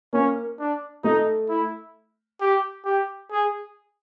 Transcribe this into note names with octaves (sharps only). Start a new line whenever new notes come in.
A#3 C#4
D4
A3 D#4
E4
G4
G4
G#4